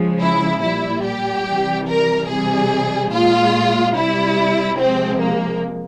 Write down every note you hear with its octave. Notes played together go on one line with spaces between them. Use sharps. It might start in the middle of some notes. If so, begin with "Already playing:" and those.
Already playing: C#3 F3 G#3
E4
A#2 G3 E4
G4
C3 E3 G3
A#4
C3 E3 G3 G#4
A#2 G#3 F4
C3 G3 E4
C3 F3 G#3 C4
A#3